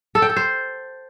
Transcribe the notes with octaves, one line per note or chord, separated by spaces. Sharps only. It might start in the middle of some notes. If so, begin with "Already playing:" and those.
A4
G5
A4
C5